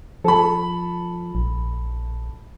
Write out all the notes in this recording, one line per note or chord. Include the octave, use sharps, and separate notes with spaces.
F3 A4 A5 B5
A#1